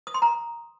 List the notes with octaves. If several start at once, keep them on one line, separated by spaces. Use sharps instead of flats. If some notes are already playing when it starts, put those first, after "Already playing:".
D#6
C6
A#5